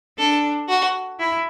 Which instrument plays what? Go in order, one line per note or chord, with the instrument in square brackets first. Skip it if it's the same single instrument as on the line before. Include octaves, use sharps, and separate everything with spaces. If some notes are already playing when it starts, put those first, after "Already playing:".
[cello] D4 [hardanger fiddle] A4
[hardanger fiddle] F#4
[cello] E4